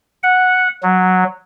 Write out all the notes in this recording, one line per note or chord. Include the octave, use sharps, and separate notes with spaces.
F#5
F#3